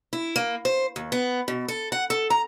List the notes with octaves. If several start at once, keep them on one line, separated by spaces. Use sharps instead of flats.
E4
A#3
C5
D#2
B3
B2
A4
F#5
A4
A#5